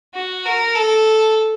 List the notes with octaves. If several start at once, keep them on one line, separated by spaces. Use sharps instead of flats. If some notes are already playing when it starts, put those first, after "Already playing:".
F#4
A#4
A4